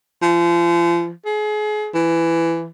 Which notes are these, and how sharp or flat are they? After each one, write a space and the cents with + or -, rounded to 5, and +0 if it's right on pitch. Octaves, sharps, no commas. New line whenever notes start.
F3 -35
G#4 +35
E3 +15